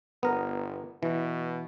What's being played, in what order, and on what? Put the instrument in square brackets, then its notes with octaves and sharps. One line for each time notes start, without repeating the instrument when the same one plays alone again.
[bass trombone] G1 [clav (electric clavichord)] B3 A#4
[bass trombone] B2 [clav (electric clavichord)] E3